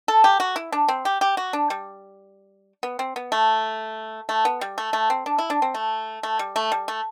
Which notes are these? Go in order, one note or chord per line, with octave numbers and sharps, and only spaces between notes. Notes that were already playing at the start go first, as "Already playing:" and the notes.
A4
G4
F#4
E4
D4
C4
G4
G4
F#4
D4
G3
B3
C4
B3
A3
A3
B3
G3
A3
A3
C4
D4
E4
D4
C4
A3
A3
G3
A3
G3
A3